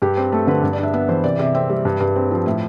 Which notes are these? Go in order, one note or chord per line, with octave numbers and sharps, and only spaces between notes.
G2 G4
C4
A3 A4
D3 B4
G2
D5
D4 E5
B3 E5
E3 C5
C3 D5
C3 E5
C4 E5
G3
G2
G2
C4
F3
A2 E5